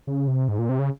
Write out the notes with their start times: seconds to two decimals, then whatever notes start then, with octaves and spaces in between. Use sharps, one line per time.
0.07 C#3
0.27 C3
0.48 G#2
0.59 A#2
0.69 C3
0.79 C#3